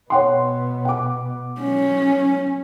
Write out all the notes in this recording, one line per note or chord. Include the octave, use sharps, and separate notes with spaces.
B2 B3 C#5 F#5 C6
F#5 D6
F#3 C#4